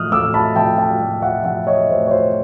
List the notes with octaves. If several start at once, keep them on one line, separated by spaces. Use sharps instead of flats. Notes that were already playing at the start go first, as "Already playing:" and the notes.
Already playing: A2 F3 D#6 F6 F#6
A2 D6 E6
A5 B5
F3 G5 A5
G5 A5
A2
E5 F#5
F3 E5 F#5
C#5 D#5
A2 C5
C#5
C5